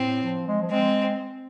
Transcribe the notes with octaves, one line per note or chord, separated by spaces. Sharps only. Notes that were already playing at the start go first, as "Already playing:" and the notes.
Already playing: A2 C4
F3
G#3
F3
G#3 C4